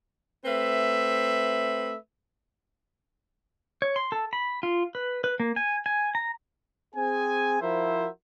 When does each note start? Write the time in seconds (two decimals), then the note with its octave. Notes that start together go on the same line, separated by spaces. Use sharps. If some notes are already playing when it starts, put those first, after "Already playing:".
0.45 A3 C4 B4 E5
3.82 C#5
3.96 C6
4.12 A4
4.33 B5
4.63 F4
4.95 B4
5.24 B4
5.40 A#3
5.56 G#5
5.86 G#5
6.15 A#5
6.95 C4 G#4 G#5
7.62 F3 E4 F#4 A#4 C5 E5